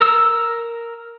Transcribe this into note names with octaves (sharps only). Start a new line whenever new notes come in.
A#4 E6